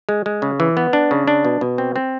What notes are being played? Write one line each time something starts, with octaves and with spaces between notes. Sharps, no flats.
G#3
G#3
C#3
E3
B3
D4
C#3
D4
B2
B2
C4
C4